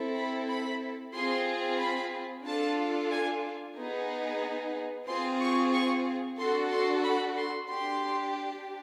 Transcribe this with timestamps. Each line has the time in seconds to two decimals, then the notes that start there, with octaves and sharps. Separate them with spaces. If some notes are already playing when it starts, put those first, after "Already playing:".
Already playing: C4 E4 A4
0.16 B5
0.48 B5
1.14 C4 F4 G#4 C6
1.79 B5
2.45 D4 F4 A4 A5
3.11 G#5
3.77 B3 D#4 G#4
5.07 C4 F4 G#4 C6
5.40 C#6
5.73 C#6
6.39 D4 F#4 A4 C6
6.72 C6
7.05 B5
7.37 C6
7.69 D4 G4 C6